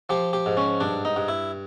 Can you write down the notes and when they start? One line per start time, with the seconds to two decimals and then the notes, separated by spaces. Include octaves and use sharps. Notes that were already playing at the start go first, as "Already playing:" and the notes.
0.09 F3 G4
0.33 G4
0.46 G#2
0.57 C#4
0.80 G2 D4
1.05 D#4
1.16 G2
1.28 E4